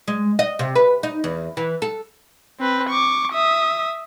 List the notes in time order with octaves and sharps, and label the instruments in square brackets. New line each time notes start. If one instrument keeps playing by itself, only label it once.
[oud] G#3
D#5
C3
B4
D#4
E2
E3
A4
[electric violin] C4 B4
C#6 D6
E5 D#6